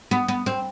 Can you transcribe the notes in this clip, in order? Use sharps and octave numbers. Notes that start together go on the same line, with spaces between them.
B3
B3
C4